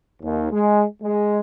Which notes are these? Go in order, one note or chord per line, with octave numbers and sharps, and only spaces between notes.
D#2
G#3
G#3